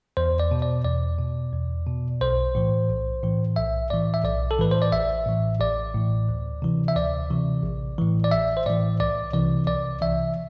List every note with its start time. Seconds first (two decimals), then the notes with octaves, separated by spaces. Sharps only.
0.17 E2 C5
0.40 D5
0.51 B2
0.62 D5
0.85 E2 D5
1.19 B2
1.53 E2
1.87 B2
2.21 B1 C5
2.55 A2 E3
2.89 B1
3.23 A2 E3
3.56 B1 E5
3.90 A2 E3 D5
4.14 E5
4.24 B1 D5
4.51 A4
4.58 A2 E3 B4
4.71 C5
4.82 D5
4.92 A1 E5
5.26 A2 E3
5.60 A1 D5
5.94 A2 E3
6.29 D2
6.62 C3 E3
6.88 E5
6.96 D2 D5
7.31 C3 E3
7.64 A1
7.99 A2 E3
8.24 D5
8.31 A1 E5
8.57 C5
8.66 A2 E3 D5
9.00 C2 D5
9.34 C3 E3 D5
9.67 C2 D5
10.02 C3 E3 E5